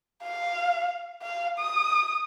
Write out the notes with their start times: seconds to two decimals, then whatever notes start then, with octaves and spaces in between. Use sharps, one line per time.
0.23 F5
1.23 F5
1.59 D#6